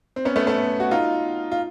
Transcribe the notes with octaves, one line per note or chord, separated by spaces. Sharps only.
C4
B3 C#4
A3 B3
A3 B3
F#4
D#4 F4
F4